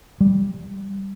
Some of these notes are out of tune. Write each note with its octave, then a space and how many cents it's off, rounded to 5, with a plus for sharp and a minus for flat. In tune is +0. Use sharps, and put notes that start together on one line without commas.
G3 +5